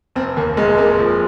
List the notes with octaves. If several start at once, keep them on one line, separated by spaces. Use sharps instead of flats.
F1 C4
D#2 A#3
F1 G#3
C3 A#3
F3